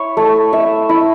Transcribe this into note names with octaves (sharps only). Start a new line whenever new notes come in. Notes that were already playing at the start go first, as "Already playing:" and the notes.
Already playing: E4 C#5
A3
E5
E4